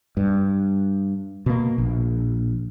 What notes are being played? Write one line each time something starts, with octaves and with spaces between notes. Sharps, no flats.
G2
B2 A#3
A#1